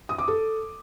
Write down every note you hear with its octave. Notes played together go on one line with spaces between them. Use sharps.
D#6
D6
A4